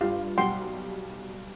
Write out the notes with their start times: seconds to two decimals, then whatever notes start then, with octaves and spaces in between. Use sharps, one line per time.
0.01 G2 F4 G4 F5
0.38 B1 G3 F#5 G5 C6